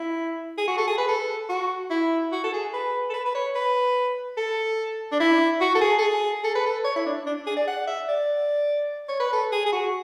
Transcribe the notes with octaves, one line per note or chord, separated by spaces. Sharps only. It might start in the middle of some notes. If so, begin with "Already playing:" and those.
Already playing: E4
G#4
F#4
A4
G#4
B4
A4
F#4
E4
F#4
A4
G#4
B4
A4
B4
B4
C#5
B4
A4
D4
E4
F#4
A4
G#4
A4
G#4
A4
B4
A4
C#5
E4
D4
D4
G#4
D5
F#5
E5
D5
C#5
B4
A4
G#4
G#4
F#4